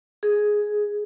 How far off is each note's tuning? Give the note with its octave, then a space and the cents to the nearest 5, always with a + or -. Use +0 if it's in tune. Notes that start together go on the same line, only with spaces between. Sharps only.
G#4 +5